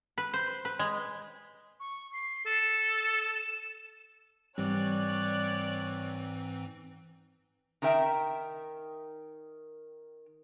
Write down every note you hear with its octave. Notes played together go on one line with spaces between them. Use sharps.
B4
C5
B4
G#3
C#6
C7
A4 E7
G#2 E3 G3 C4 C#5 D5 F#6
D#3 D#4 A#4 E5 G5